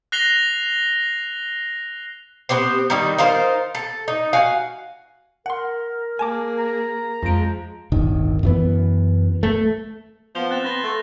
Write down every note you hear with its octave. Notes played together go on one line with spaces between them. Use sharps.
F#6 A#6 C7 F7 G7
B3 C4 G4 C5
D#3 G3 D#4
D#4 F4 A#4 C5
A4
D#4
F#4 F5 G#5
A#4 F#5 C6
A#3 G#4 G#5 A5 D6
A#5
F2 F3 G#3 D7
D1 G1 D#3
F#2 E3 B3
A3
F3 B3 G6 F7 G7
C4 F#6 A6 E7
B3 C6 A#6 E7 G7
A3